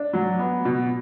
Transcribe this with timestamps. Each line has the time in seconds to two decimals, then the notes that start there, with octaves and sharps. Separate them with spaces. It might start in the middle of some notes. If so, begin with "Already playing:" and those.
Already playing: D4
0.13 F#3
0.39 B3
0.65 B2